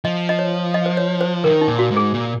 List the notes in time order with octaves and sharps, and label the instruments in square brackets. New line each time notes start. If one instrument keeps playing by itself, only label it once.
[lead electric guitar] F3 [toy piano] D#5
[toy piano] D#5
C#5
D#5
C5
C#5
C5
[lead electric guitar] D#3 [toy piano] A#4
[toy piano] D#4
[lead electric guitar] A#2
[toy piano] F#4
[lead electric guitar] G#2
[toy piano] G#4
[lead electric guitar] A#2